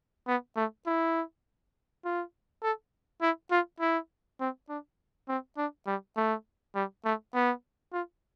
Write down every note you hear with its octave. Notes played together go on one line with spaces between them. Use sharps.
B3
A3
E4
F4
A4
E4
F4
E4
C4
D4
C4
D4
G3
A3
G3
A3
B3
F4